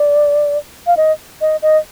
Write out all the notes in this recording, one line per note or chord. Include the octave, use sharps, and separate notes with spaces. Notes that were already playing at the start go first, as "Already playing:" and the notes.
Already playing: D5
F5
D#5
D#5
D#5